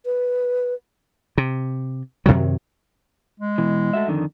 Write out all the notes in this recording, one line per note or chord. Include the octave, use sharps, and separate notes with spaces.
B4
C3
F#2 C3 D#3 F#3
G#3
B2 E3
A3 F#4 E5
F2 D3 D#3